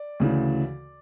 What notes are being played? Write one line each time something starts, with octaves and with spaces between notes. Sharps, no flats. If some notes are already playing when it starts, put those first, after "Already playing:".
Already playing: D5
D2 C#3 E3